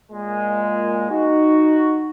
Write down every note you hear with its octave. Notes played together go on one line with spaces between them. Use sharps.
A#2 G#3
D#4 F#4